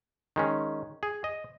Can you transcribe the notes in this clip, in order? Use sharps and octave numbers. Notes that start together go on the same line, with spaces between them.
D#3 G#3 C#4
G#4
D#5